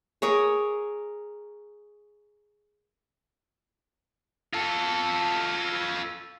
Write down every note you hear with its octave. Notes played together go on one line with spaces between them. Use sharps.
G#4 A#4 C#5
F4 A4